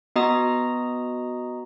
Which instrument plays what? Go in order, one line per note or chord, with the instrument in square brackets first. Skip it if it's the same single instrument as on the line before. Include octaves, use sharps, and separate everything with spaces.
[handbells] B3 F#4 D#5 A#5 D#6